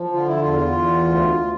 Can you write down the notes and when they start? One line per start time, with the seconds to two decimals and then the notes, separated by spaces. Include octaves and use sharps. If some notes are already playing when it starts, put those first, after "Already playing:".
Already playing: F3
0.13 D3 F4
0.27 E4
0.41 E2 F4
0.75 E2
1.05 D2